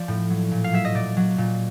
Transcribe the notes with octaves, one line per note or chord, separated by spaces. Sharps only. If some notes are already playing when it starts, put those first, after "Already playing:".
Already playing: F3 D5
A2
F#3
A#2
F5
F#3 E5
D#5
A#2 D5
F#3
A#2